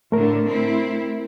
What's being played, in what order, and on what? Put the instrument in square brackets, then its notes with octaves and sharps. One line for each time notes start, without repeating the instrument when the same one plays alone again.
[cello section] A2 D3 [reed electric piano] A3 A#4
[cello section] C4 E4